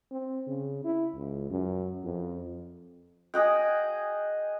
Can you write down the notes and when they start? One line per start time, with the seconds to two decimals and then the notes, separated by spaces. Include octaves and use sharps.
0.11 C4
0.47 C#3
0.84 E4
1.15 C#2
1.51 F#2
2.04 F2
3.34 G#4 D#5 F#5 G5